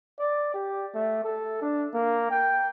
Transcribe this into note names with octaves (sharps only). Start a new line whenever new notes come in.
D5
G4
A3
A4
D4
A#3
G5